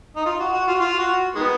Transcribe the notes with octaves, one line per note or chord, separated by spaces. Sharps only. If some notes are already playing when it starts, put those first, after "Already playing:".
D#4
F4
F#4
F#4
F4
F#4
F4
F#4
D#3 G#3 B3